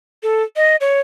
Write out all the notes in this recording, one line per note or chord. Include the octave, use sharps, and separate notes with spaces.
A4
D#5
C#5